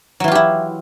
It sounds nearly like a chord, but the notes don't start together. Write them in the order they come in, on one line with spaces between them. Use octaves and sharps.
F#3 E3 F4 G4 E4